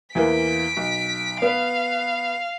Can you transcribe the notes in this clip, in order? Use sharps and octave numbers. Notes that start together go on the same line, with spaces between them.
E2 E3 A#3 B6 D7
B1
B3 B4 F5